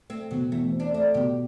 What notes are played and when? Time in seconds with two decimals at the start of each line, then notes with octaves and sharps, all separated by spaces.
0.10 A3 C4
0.31 B2 F#3
0.52 E2 A3
0.73 C4
0.80 D4
0.94 A3 D4
1.14 B2 G4